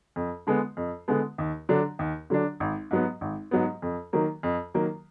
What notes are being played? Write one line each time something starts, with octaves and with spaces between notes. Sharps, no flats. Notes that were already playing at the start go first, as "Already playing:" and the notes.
F2
D3 G#3 B3
F2
D3 G#3 B3
D#2
D3 F#3 D4
D#2
D3 F#3 D4
G#1
G#2 F#3 B3
G#1
G#2 F#3 B3
F2
D#3 F#3 A#3
F2
D#3 F#3 A#3